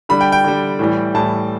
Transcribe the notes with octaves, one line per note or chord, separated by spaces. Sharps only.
D3 G3 B5
G5
G5
D3 G3
A2 E3 G3
A2 E3 G3 A5